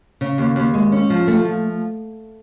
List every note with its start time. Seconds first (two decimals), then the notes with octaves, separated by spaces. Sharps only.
0.21 C#3
0.38 D#2
0.56 D#2
0.74 G#3
0.92 C#4
1.10 F3
1.27 A3
1.45 F3